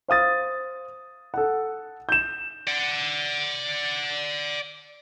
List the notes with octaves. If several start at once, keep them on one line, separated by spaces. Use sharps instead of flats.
C5 F5 D#6 A6
A4 F#5
G6 E7
D5 F#5